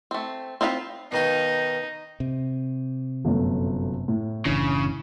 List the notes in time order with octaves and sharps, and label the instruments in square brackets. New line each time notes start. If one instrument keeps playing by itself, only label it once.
[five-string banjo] A3 C4
C4 D#4 F4 F5 B5
[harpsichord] B2 D#3 F4 [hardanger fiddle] D#4
[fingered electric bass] C3
[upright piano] G1 F#2 A3
A2
[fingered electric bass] F#1 E3 D4 [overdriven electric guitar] C#3